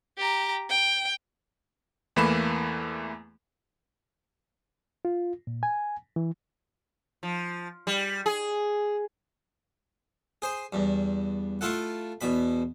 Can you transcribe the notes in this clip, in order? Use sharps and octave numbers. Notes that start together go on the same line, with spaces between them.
G4 A#5
G5
E2 E3 A3 A#3 B5 E7
F4
A#2
G#5
E3
F3
G3
G#4
G#4 C5
E2 G2
A3 E4 F4 A4 F#5
E2 B2 B5